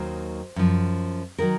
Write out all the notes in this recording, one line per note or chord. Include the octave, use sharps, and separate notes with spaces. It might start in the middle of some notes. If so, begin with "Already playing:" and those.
Already playing: D#2 D#3 F#3 C5
F#2 F3
D#3 F#3 A#4